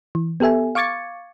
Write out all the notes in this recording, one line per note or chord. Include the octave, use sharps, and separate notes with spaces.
E3
B3 G4 A4 E5 G#5
F5 C#6 D6 G#6 A6 C#7